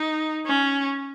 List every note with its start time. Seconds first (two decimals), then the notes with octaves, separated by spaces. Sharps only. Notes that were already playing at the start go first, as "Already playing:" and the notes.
Already playing: D#4
0.46 C#4